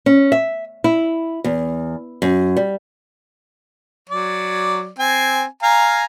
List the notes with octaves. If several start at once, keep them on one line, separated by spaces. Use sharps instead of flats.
C#4
E5
E4
E2
F#2
G3
F#3 D5
C4 G#5
F5 G#5 A#5